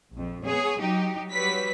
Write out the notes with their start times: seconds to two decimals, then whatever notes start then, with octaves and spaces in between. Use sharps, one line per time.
0.13 A#1 F2
0.44 B3 G#4 C#5
0.80 F#3 D#4 G4
1.30 F#3 G3 B4 B6